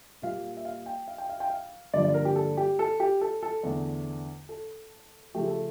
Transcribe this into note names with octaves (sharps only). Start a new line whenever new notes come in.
A#2 G3 A#3 F5
E5
F5
G5
F5
G5
F5
G5
F5
G2 D3 F3 A#3 D5
D5
A#4
G4
A4
G4
A4
G4
A4
A4
E2 D3 A3
A4
C#3 F3 A3 G4
A4